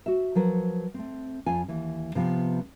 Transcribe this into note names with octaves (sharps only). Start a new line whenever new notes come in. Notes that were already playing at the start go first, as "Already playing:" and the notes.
F#4 E5
F3 F#3 A#4 B4
A3 C4
F2 F4 G#5
D#2 E3
C3 F3 B3